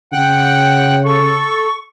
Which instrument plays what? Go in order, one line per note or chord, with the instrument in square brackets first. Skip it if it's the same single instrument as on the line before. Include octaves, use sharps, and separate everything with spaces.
[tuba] C#3 [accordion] F#5 G5 F#6
[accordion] A4 [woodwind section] C#6